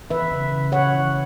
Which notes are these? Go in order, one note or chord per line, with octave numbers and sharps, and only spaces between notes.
E3 B4 E5
C#3
C#3
C#3 C#5 F#5
E3